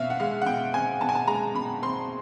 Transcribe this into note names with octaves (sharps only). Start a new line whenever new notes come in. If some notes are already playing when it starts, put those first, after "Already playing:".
Already playing: B2 C4 E5 F5
F#5
G#3 F5
F#5
B2 G5
C4 G#5
B2 A5
G#5
A5
G#3 A#5
B2 B5
C4 C6